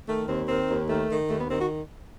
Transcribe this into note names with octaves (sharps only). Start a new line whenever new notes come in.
D#3 A3
D#2 C4
D#3 C4
D#2
D#3 A3
D#3
D#2 A3
B3
D#3 C4
F#4